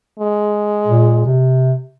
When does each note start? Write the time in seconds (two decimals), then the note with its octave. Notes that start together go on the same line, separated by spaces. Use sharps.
0.19 G#3
0.87 A#2
1.25 C3